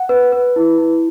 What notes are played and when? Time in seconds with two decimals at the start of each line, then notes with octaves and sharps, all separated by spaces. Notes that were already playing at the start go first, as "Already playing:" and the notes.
Already playing: F#5
0.09 B4
0.32 B4
0.56 E4
0.78 E4